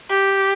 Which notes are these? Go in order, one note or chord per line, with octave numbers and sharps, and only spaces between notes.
G4